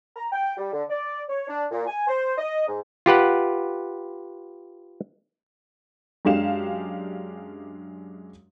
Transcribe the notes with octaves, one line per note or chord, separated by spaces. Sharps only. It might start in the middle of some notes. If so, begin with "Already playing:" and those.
A#5
G5
G3
D3
D5
C#5
D4
A#2
G#5
C5
D#5
G#2
F4 G4 B4 F#5
F#2 G#3 D4 G4 F5 E7